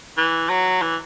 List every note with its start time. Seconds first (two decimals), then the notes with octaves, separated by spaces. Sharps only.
0.18 E3
0.50 F#3
0.82 E3